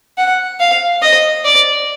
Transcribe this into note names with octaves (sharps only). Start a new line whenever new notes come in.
F#5
F5
D#5
D5